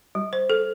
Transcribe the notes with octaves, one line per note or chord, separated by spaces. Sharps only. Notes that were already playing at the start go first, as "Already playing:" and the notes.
G3
C5
A4